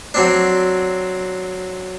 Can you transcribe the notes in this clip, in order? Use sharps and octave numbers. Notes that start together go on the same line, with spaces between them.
F#3 C4 D4